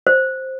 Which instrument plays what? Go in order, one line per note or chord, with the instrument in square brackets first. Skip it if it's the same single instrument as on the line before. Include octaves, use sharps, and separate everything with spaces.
[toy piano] C5